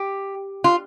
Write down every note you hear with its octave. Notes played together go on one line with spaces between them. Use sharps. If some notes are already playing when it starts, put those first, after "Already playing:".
Already playing: G4
F4